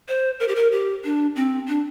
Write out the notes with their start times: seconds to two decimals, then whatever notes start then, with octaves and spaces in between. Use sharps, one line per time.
0.08 C5
0.40 A#4
0.48 G4
0.56 A#4
0.72 G4
1.04 D4
1.36 C4
1.68 D4